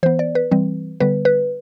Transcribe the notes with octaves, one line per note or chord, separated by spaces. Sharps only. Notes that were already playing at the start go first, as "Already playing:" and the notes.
E3 B3 C5
D5
B4
E3 G3 C4
D3 G3 B3 B4
B4